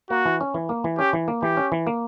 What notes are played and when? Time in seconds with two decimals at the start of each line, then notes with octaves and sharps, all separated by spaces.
0.10 A#3 F#4
0.25 E3
0.41 C#4
0.54 E3
0.69 A#3
0.84 E3
0.99 C#4 G4
1.13 E3
1.28 A#3
1.43 E3 G4
1.57 C#4
1.72 E3
1.87 A#3